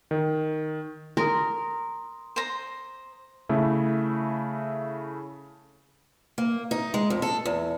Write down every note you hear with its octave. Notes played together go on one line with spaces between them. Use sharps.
D#3
A#4 C6 D#6
C5 A#5
C#3 A3 E4
A#3
D#4
G#3
F2
A4
E2